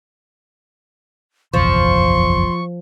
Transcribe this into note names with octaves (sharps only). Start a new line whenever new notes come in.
F#1 B1 E2 F3 C6 C#6